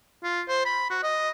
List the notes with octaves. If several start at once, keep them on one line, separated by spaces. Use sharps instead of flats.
F4
C5
B5
F#4
D#5